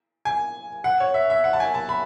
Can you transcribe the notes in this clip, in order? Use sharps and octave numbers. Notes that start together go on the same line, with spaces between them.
G#5
F#5
C#5
E5
E5
F#5
A5
G#5
A5
B5